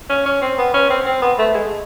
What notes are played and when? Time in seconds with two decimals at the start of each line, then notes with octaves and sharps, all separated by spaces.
0.10 C#4
0.26 C#4
0.42 C4
0.58 B3
0.74 C#4
0.90 C4
1.06 C4
1.22 B3
1.39 A3
1.54 G#3